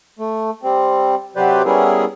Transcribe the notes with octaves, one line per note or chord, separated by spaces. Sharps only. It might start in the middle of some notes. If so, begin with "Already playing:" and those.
A3
G3 C4
C3 F#3 G4 B4 C5 D5
G3 B3 C#4 E4 G#4 A#4